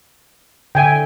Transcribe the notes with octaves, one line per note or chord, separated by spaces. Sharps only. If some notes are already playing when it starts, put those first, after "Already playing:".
D3 E5 G5 G#5